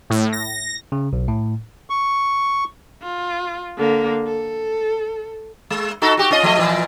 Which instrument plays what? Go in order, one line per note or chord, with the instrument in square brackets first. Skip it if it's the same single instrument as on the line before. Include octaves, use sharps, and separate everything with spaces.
[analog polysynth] A2
A#6
[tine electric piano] C#3
B1
A2
[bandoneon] C#6
[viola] F4
D3 A#3
A4
[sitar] G#3
D#4 F#4 A4
F#4 G4
C#4 F4 D#5
F3 A3 D#5
A#2 E3 F3